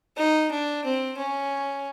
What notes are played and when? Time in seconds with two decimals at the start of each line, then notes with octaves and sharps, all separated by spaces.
0.17 D#4
0.51 D4
0.85 C4
1.17 C#4